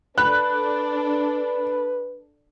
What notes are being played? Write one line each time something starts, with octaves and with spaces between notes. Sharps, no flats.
D4 A4 B4 B5 F#6